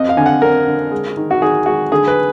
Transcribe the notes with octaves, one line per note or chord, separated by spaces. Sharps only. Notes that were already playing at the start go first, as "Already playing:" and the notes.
Already playing: F2 D#5
F5
D3 G#5
F#5
F2 A#4
D3
G#3
D#3
F#4
D#3 G#4
G#3 F#4
D3 G#4
B4